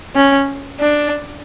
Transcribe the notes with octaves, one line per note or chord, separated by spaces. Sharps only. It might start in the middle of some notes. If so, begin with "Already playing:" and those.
C#4
D4